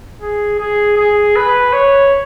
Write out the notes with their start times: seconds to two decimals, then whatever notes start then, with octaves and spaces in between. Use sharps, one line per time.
0.22 G#4
0.60 G#4
0.97 G#4
1.36 B4
1.73 C#5